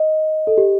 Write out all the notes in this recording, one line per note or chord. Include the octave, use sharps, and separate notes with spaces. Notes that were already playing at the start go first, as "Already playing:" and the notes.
Already playing: D#5
A4
G4